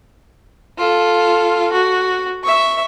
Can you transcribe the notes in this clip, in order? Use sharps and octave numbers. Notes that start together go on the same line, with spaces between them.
F4 A4
F#4
E5 C#6